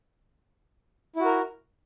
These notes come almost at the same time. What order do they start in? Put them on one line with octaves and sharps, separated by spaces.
E4 F#4 A#4